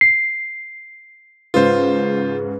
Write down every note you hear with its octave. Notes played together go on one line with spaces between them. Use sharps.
C7
G#2 C#3 F4 B4 C5